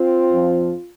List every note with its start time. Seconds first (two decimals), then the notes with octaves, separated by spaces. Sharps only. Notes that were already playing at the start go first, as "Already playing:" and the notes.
Already playing: C4 F4
0.31 F2 F3